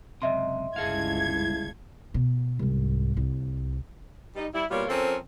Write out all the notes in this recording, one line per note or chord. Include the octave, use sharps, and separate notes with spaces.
C#2 F#2 C3 D#5 E5 C6
G1 C#2 E4 G#4 A4 F5 G#6
B2
C2 G#2
C2
G3 D#4
G3 E4
B2 G3 A#3 F4 C#5
F3 C4 C#4 A4 A#4